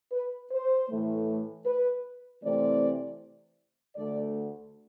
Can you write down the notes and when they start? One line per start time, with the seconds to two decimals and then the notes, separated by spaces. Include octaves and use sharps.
0.13 B4
0.52 C5
0.90 A2 E3 A3
1.66 B4
2.43 C3 E3 A3 C4 D5
3.96 D2 D3 A3 D5